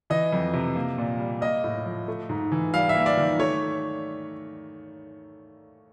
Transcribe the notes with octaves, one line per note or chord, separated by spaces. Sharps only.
E3 D#5
F2
C3
A#3
A#2
G3
A#3 D#5
A2
F3
A3
G#2
E3
G3 F5
E5
A#3
D5
D#3
A3 C#5